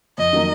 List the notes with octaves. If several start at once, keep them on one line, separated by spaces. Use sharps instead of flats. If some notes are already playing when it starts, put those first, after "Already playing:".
F2 D#5
D#3 F#3 A#3 D#4